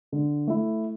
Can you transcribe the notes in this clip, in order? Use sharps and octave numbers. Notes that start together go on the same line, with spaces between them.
D3
A3 E4